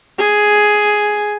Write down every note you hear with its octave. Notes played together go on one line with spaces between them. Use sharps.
G#4